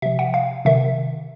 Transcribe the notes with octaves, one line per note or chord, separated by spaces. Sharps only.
C3 F3 E5
F#5
F5
C3 D#3 E5